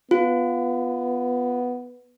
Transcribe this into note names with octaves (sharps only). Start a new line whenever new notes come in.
B3 F4